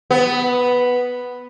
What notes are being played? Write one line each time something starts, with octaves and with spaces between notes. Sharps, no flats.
B3